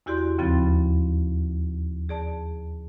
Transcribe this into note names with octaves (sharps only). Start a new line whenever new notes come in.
E2 E4 F#4 G4 D5 C6
D#2 C#3 F3 C4 B5 A6
G#4 D5 A5